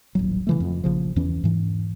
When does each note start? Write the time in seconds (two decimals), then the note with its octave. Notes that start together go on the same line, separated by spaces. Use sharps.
0.15 D#1 A1 F#3
0.47 C#3 E3 A3
0.60 F2
0.84 A#1 C#3 F3
1.16 E2 E3 C#4
1.44 G#2 E3